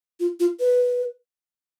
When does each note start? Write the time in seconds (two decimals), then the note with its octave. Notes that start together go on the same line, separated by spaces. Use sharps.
0.20 F4
0.40 F4
0.60 B4